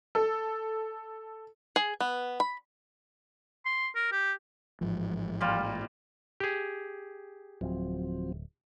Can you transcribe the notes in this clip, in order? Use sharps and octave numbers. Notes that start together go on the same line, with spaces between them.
A4
G#4
B3
B5
C6
A#4
G4
A1 G#2 F3
A#2 G3 F4
G4 G#4
D1 F3 F#3 C4